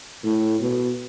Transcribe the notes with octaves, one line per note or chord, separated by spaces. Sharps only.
A2
B2